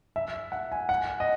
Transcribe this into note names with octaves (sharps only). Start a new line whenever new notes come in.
E5
F#5
G#5
F#5
D#5